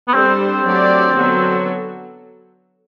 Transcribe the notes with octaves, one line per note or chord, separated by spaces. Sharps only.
B3
G3 C4 D4 A4 C5
C4
F#3 A3 D4 G4 D5
D3 F#3 B3 F#4 A4